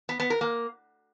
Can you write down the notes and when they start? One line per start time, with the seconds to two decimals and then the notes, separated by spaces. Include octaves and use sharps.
0.09 B3
0.20 B3
0.30 A#4
0.41 A#3